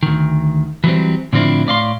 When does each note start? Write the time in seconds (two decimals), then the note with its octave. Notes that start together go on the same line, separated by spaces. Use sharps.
0.03 D2 D#3
0.84 E3 F#3 G3 C4
1.33 A2 D3 F3 C4 D4 E4
1.67 A2 D5 F5 C6